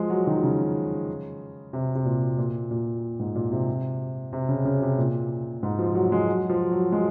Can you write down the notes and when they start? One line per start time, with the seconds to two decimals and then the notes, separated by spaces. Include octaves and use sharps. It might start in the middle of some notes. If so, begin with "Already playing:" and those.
Already playing: F3 G#3
0.10 F#3
0.27 D#3
0.43 C#3
1.73 C3
1.95 C3
2.05 A#2
2.38 A#2
2.71 A#2
3.19 G#2
3.35 A#2
3.52 C3
4.33 C3
4.49 C#3
4.65 C#3
4.82 C3
4.98 A#2
5.63 G#2
5.79 F3
5.95 F#3
6.12 G#3
6.27 F#3
6.49 F3
6.71 F#3
6.92 G#3